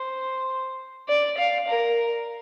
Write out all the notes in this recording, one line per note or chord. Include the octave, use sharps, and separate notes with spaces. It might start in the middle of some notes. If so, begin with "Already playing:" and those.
Already playing: C5
D5
F5
A#4